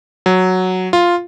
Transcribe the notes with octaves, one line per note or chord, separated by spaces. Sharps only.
F#3
F4